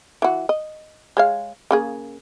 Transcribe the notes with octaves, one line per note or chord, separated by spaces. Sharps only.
E3 F#4
D#5
G#3 C#5 F5
C#3 A#3 G#4